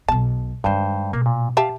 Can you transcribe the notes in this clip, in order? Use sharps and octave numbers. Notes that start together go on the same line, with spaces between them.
B1 B2 A5
G2 D#3 G#3 C5
B2 A#3
A#2
G4 E5 F5 A5